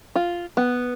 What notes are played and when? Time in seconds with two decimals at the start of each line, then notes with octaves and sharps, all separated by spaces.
0.16 F4
0.57 B3